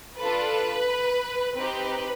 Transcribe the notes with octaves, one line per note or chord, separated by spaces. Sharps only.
D4 F4 A4 B4
C4 D#4 G4 B4